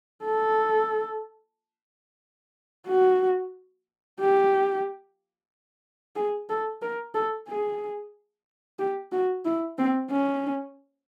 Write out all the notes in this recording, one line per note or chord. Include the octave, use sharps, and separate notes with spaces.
A4
F#4
G4
G#4
A4
A#4
A4
G#4
G4
F#4
E4
C4
C#4